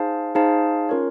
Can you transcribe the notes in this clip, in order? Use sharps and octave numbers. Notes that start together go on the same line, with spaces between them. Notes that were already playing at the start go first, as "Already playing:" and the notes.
Already playing: D#4 G#4 C5 F5 A5
D#4 G#4 C5 F5 A5
C#4 F4 A#4 C#5